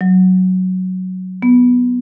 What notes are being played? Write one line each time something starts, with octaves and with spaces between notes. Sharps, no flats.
F#3
B3